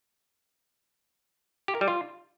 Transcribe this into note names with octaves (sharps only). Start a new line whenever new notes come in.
G4
A#4
G3
F4